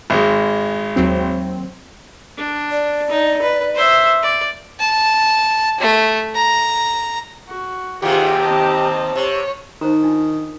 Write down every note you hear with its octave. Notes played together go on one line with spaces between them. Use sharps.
G#1 G#3
D#2 F#3 C4
D4
D5
D#4
B4
C5 E5
D5
A5
A3
A#5
F#4
D#2 C3 F4 G4 G#4 F#5
C4 D#5 A5 A#5
C3 C#5
D#3 D#4 C5 A#5
D4 D#4 F4